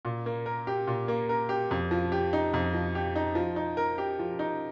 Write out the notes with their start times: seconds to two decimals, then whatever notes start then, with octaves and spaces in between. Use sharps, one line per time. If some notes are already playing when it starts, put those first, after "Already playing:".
0.05 A#2
0.26 A#3
0.46 A#4
0.67 G4
0.87 A#2
1.08 A#3
1.29 A#4
1.49 G4
1.71 F2
1.91 F3
2.12 G4
2.33 D#4
2.54 F2
2.74 F3
2.95 G4
3.16 D#4
3.35 F3
3.56 D#4
3.77 A#4
3.98 G4
4.19 F3
4.39 D#4